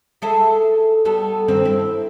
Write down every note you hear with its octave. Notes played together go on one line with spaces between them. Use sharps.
G#4 A4 E5
G3 B3 A4
G2 D#3 C4
E4